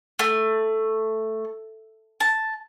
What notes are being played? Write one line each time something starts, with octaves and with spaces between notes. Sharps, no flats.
A3
A5